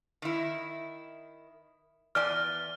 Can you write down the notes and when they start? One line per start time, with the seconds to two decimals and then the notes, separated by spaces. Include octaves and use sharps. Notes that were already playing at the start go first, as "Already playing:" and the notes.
0.22 D#3 E4
2.15 E2 D5 G#5 F6